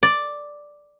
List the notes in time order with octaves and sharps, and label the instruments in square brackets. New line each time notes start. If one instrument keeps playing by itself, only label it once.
[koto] D5